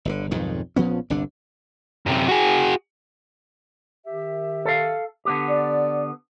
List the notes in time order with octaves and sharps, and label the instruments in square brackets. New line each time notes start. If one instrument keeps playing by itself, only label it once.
[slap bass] G1 B2 D3
B1 F2 G#2 D#3
A#1 F3 B3 C#4
G1 C2 D3 D4
[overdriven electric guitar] F#2 C3
F#4 G#4
[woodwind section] D#3 G4 E5
[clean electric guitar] A4 F5
D3 B3 G4
[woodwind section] D5